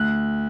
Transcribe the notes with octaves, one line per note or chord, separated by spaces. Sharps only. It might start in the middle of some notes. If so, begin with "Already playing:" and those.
Already playing: D2 F#6